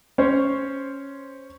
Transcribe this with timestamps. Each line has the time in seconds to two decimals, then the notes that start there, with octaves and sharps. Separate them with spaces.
0.18 C#4 C5 C#5